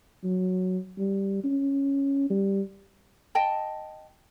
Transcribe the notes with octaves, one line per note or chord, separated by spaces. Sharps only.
F#3
G3
C#4
G3
D#5 G5 A5